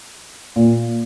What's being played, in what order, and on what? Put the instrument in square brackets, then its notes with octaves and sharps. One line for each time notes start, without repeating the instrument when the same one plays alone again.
[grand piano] A#2